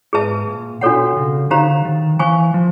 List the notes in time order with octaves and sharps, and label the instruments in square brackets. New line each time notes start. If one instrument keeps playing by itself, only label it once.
[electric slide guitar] G#2 [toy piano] G#4 B4 E5 A5
[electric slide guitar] A#2
[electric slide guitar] B2 [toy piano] D4 F#4 A4 C#5 F#5
[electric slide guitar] C#3
[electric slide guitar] D3 [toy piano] D#4 G4 C5 F5 A#5
[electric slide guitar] D#3
[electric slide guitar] E3 [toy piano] C5 F5 G#5 C#6
[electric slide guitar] F3